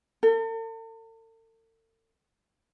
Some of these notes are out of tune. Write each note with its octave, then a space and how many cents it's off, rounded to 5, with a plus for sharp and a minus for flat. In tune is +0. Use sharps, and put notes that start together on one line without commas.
A4 +45